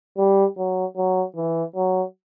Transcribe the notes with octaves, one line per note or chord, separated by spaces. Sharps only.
G3
F#3
F#3
E3
F#3